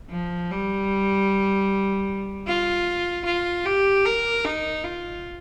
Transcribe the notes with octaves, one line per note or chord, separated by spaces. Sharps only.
F3
G3
F4
F4
G4
A#4
D#4
F4